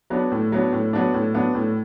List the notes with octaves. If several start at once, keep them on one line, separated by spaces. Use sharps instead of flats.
F#3 B3 D4
A2
F#3 B3 D4
A2
F#3 B3 D4
A2
F#3 B3 D4
A2